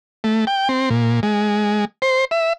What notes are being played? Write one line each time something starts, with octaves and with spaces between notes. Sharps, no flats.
A3
G5
C4
A#2
G#3
C5
E5